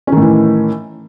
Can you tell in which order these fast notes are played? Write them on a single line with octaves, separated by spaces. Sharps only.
C#4 D#3 A2 E3